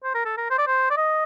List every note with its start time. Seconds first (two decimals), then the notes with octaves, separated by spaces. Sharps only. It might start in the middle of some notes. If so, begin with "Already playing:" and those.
0.04 C5
0.15 A#4
0.25 A4
0.37 A#4
0.50 C5
0.58 D5
0.67 C5
0.90 D5
0.97 D#5